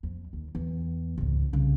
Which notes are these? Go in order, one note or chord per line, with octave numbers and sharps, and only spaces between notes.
F2
D#2
E2
C#2 G#2
C2 C#3